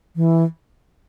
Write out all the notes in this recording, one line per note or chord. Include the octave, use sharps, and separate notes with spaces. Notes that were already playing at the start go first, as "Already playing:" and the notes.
E3